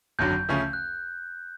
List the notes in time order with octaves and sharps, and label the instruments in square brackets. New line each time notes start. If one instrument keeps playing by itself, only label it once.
[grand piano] G#1 F#2 D3 F#3 [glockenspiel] G6
[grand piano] D2 C#3 F3 A3 C#4
[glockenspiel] F#6